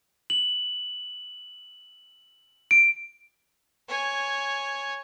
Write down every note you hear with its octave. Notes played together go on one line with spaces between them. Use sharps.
F#7
D7
C#5 G#5